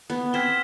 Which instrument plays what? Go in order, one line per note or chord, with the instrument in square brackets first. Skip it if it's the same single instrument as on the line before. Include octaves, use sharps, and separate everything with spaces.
[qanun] B3
[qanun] C4 [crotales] F6 G#6 B6 E7 G7